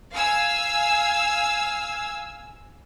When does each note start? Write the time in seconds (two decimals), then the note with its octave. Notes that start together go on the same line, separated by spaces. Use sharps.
0.15 F5 G#5 E6